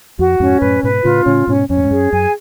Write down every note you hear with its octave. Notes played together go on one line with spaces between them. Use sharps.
F2 F#4
F2 G#2 C#4
F#2 A2 B4
G#2 B2 B4
A2 C#3 F4
A2 C#3 C#4
G#2 B2 C#4
F2 C#4
A2
G#2
F#2 G#4
F#2 G#5